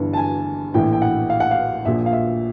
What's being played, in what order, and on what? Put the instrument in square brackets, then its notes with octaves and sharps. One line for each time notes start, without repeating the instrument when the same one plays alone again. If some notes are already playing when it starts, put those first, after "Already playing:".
Already playing: [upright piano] G1 G2 E3
A5
G#5
A#1 A2 E3 G5
G5
F#5
F5
F#5
F5
A#1 A#2 F3 E5
F5
E5